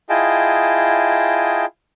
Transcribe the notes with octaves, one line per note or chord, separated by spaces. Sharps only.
E4 F4 G#4 D#5 G5 A5